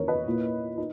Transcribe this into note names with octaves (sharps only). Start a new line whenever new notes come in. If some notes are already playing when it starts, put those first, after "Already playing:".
Already playing: E2 D#3 A#3 C#4 A#4 C#5
B4 D#5
A#2 A#3 E4
D#4